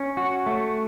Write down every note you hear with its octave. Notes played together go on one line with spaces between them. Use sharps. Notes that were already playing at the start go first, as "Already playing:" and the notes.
Already playing: C#4
F#4
A3